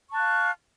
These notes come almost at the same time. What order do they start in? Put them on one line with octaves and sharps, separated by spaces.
C#6 A5 F#6 F5